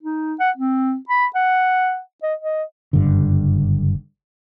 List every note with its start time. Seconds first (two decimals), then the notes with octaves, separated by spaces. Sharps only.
0.03 D#4
0.40 F#5
0.57 C4
1.09 B5
1.35 F#5
2.23 D#5
2.41 D#5
2.93 F#1 G2 D3